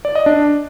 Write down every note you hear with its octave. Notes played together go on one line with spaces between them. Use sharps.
D5
D#5
D4